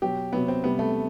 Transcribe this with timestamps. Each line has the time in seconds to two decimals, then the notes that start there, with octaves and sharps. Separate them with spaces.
0.02 B2 F#3 G4
0.33 C3 F#3 B3
0.48 C4
0.64 C3 G3 B3
0.79 A3